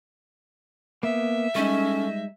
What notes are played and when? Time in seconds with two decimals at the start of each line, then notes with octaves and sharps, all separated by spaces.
1.03 A#3 B3 E5
1.55 G3 G#3 C#4 D#4 A4 C#6